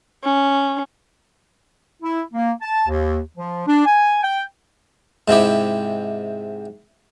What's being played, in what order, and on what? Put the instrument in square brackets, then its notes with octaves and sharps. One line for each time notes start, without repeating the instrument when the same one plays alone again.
[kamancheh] C#4
[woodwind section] E4
A#3
A5
D#2
F3
D4
G#5
G5
[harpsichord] G#2 C3 E4 G4